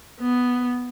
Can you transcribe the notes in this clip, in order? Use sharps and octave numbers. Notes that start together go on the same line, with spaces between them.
B3